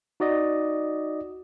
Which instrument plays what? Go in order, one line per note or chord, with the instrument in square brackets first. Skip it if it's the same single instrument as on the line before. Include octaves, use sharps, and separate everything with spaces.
[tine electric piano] D#4 F#4 D5 D#5